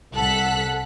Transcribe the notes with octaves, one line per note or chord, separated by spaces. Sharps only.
C2 A4 F#5 F#6 B6